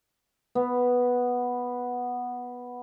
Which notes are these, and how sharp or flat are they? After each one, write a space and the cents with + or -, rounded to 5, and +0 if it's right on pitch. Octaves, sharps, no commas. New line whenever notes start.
B3 -5